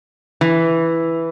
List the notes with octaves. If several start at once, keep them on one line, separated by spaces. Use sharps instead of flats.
E3